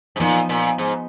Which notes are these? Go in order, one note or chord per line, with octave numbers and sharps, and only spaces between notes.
G#2
A#2 F3 B3 D#4
A#2
G#2